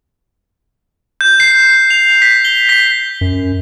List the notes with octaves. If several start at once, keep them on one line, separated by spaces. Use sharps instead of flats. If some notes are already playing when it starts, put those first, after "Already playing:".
G6
C7
F7
B6
G7
B6
F#2